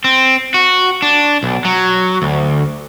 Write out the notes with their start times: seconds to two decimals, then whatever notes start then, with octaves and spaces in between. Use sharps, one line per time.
0.04 C4
0.54 F#4
1.02 D4
1.43 B1
1.65 F#3
2.22 D2